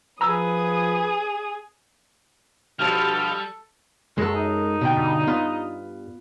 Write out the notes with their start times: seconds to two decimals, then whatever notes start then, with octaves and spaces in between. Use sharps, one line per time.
0.21 F3 G#4 B4 A#5 D#6 E6
2.79 G2 B2 F3 G3 A4 F6
4.18 F#2 G#3 A4
4.35 D#4
4.81 B2 D3 G5
4.97 G2
5.27 B3 F4